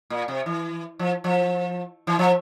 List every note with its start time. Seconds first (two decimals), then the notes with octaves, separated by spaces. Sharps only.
0.10 A#2
0.28 C3
0.46 E3
0.99 F3
1.24 F3
2.07 E3
2.19 F3